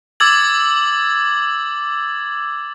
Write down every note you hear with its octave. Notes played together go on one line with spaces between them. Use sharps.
D6 E6 G#6 A6 F#7